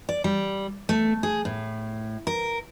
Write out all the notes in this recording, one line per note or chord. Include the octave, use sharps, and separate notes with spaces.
D5
G3
A3
G#4
A2
A#4